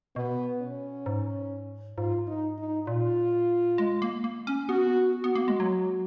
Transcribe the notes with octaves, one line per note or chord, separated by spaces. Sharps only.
B2 B3
C#4
G#2
G#2 F4
D#4
D#4
A#2 F4
G#3
A#3
A#3
C#4
B3 F#4
F#4
B3
A#3
G#3
F#3